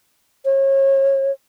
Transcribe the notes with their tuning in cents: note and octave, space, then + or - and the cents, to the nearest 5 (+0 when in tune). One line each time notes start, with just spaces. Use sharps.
C#5 -30